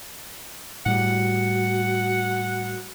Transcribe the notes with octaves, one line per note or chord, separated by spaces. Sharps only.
A2 G3 F#4 F#5